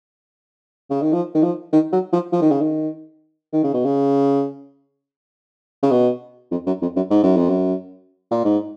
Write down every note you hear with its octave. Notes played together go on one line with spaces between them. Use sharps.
C#3
D#3
F3
D#3
F3
D#3
F#3
F3
F3
D#3
C#3
D#3
D#3
C#3
B2
C#3
C#3
B2
F2
F#2
F2
F#2
G#2
F#2
F2
F#2
A#2
G#2